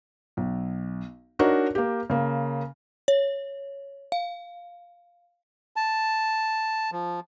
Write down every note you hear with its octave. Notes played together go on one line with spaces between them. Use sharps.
B1
D4 D#4 F#4 A#4 C#5 D#5
A#3 G4
C#3 A#3
C#5
F5
A5
F3